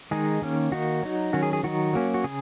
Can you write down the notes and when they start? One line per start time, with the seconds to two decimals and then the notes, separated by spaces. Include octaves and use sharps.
0.11 D#3 G#3 D#4 G#4
0.42 D#3 A#3 C#4
0.72 D#3 A#3 D#4 F#4
1.03 F#3 D#4
1.33 D#3 F#3 C#4 F#4
1.43 G#4
1.53 G#4
1.63 D#3 F#3 D#4 F#4
1.93 F#3 A#3 C#4
2.14 F#4
2.24 C#3 G#4